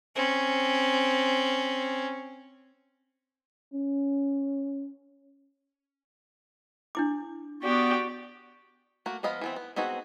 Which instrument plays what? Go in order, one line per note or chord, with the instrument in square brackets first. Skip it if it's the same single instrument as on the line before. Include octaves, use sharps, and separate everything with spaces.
[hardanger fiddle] C4 C#4
[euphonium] C#4
[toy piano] D4 E4 D6
[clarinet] B3 [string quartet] F#4 G4 D5
[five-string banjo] A3 A#3 F#4
F3 B3 D#5 F5 B5
E3 B3 C4
B3
B3 C4 D#4 F#4 G#4